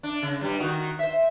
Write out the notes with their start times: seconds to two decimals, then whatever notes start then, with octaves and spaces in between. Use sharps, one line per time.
0.03 D4
0.23 C#3
0.41 G2 G3
0.60 D#3 D#4 F#4
0.99 C5 E5